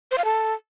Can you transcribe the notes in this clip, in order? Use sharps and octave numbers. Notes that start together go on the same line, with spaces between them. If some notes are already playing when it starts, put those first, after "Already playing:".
C5
F5
A4